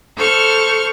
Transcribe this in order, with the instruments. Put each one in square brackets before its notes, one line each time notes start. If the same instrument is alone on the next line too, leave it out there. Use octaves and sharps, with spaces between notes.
[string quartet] A4 C5 C#6 F6